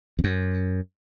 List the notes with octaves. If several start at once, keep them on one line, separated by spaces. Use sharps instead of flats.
E2
F#2